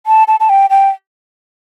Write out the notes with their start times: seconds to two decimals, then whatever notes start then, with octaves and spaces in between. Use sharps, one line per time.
0.07 A5
0.28 A5
0.40 A5
0.49 G5
0.70 G5